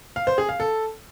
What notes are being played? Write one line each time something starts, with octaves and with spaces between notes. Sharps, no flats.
F5
C5
G#4
F5
A4